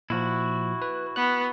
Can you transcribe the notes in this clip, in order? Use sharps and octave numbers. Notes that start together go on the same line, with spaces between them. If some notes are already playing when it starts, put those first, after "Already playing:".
A#2 F3 E4 F#4
B4
B3 F#6